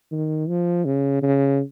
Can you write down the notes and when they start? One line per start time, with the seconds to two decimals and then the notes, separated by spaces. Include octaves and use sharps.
0.12 D#3
0.48 F3
0.85 C#3
1.22 C#3